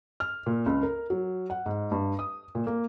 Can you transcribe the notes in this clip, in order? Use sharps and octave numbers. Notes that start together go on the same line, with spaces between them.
F6
A#2
C#2
A#4
F#3
F#5
G#2
G2
D#6
A#2
A#3